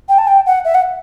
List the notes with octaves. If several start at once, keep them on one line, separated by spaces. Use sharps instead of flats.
G5
A5
G5
F#5
E5
F#5